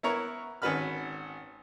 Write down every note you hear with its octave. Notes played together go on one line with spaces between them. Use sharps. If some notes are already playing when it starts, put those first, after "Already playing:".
B3 E4 A#4 C#5 A#5
G#1 C#4 F#4 B4 B5 F6